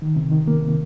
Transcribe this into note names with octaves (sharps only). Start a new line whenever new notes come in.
D#3
C3
D#3
A#3
C3